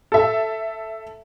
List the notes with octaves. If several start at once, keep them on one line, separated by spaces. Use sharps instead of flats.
A4 E5